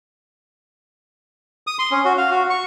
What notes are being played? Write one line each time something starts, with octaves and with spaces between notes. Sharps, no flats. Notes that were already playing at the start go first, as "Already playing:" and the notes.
D#6
C6
C#4
F#4
F5
F#4
C#6